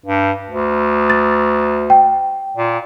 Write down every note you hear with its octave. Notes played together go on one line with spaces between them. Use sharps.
G2
D2
A6
G5
A#2